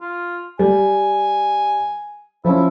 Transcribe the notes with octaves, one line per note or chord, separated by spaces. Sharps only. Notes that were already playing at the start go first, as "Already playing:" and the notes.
F4
G3 G#5
F3 C#4 E4